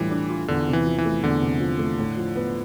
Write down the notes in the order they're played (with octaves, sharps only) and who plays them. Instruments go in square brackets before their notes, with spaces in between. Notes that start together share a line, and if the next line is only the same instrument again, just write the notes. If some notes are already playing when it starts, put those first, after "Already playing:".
Already playing: [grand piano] A2 G3 D4 F4 [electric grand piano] E3
[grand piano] D4
F4
[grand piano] E2 [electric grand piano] D3
[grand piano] C3
[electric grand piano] E3
[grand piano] F3
[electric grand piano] E3
[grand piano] A3
[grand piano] E2 [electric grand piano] D3
[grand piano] C3
F3
A3
A2
F3
B3